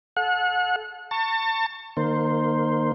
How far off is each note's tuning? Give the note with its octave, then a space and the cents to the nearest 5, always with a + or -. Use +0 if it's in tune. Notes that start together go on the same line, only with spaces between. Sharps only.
A4 -25 F#5 -35
A5 +35 C#6 +0
D#3 -30 A#3 +0 C5 +0